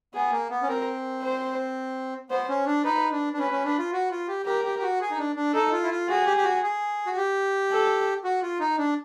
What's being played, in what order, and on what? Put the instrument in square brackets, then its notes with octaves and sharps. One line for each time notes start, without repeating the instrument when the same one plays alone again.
[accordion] B3 [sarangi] G#4
[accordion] A#3
B3
C#4
[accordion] C4 [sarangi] A#4
[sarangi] C5
[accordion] B3 [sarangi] C5
[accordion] C#4
D4
[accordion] D#4 [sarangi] B4
[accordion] D4
D4
[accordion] C#4 [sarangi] B4
[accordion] C#4
D4
F4
F#4
F4
G4
[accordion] G4 [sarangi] A#4
[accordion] G4
G4
F#4
G#4
D#4
D4
D4
[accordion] D#4 [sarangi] A4
[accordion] F4
E4
F4
[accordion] F#4 [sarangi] G#4
[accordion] G4
G4
F#4
G#4
F#4
G4
[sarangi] A4
[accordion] F#4
F4
D#4
D4